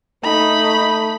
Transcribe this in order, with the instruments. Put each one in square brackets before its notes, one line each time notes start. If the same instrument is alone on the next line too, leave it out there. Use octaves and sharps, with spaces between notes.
[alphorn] A3 [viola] D#4 [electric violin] B5